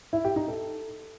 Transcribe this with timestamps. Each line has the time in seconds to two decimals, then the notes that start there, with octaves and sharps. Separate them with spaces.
0.13 E4
0.25 G4
0.36 D#4
0.48 A4